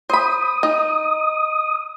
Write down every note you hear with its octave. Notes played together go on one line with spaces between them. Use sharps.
C5 B5 D#6
D#4